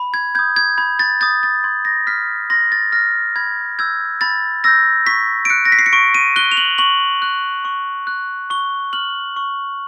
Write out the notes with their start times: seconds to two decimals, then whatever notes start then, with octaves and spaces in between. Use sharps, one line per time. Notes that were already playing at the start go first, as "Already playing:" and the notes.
Already playing: B5
0.14 G#6
0.35 D#6 G6 G#6
0.56 G#6
0.78 B5 G#6
0.99 A6
1.21 D#6 G6 A6
1.43 A6
1.64 C6 G#6
1.85 A#6
2.07 F6 B6
2.50 C6 A#6
2.72 A6
2.92 F6 A#6
3.36 B5 G#6
3.79 E6 G6 G#6
4.21 B5 A6
4.64 E6 G6 A#6
5.06 C#6 B6
5.45 D7
5.50 F#6 C#7
5.65 A#6
5.72 B6
5.79 C7
5.86 C#7
5.93 C#6 D7
6.14 D#7
6.36 F#6 G7
6.51 F7
6.57 F#7
6.78 C#6 F#7
7.22 F#6
7.65 C#6
8.07 F#6
8.50 C#6 G7
8.93 F6 F#7
9.36 C#6